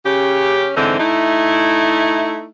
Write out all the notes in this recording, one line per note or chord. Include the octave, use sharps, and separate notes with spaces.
C#3 C#4 G4
G#2 D3 E3 C4 D#4
A3 D#4 E4